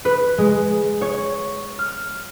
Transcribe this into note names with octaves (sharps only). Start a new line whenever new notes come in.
B4
G#3
C#5
F6